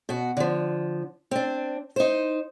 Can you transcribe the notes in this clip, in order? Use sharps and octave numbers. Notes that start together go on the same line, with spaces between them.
B2 F#4
D3 F3
C4 D4
D#4 C5